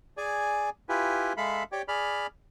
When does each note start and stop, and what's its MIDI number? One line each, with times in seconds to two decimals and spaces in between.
0.17 0.70 68
0.17 0.70 74
0.17 0.70 80
0.89 1.33 64
0.89 1.33 65
0.89 1.33 67
0.89 1.33 71
0.89 1.33 80
1.37 1.63 56
1.37 1.63 69
1.37 1.63 76
1.37 1.63 77
1.37 1.63 83
1.72 1.82 67
1.72 1.82 73
1.72 1.82 74
1.72 1.82 79
1.88 2.27 68
1.88 2.27 74
1.88 2.27 83
1.88 2.27 89